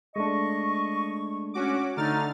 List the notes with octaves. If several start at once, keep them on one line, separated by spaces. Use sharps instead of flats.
G#3 A3 D4 D#5 C#6
C#4 F#4 D6
D3 A3 D#4 F6 A6